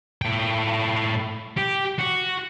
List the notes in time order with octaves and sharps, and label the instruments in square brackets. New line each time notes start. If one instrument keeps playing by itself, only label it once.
[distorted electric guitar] A2 G5
G4
F#4